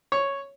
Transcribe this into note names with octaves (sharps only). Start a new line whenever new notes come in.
C#5